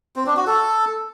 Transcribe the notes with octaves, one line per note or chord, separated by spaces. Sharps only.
C4
D4
F#4
A4